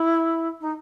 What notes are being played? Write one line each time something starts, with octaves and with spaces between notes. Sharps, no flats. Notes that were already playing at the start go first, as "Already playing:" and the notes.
Already playing: E4
D#4